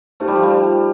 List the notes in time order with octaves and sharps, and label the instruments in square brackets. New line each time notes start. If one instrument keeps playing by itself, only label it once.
[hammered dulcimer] A3 [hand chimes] D#4 G4 C5
[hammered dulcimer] G3
F3
G3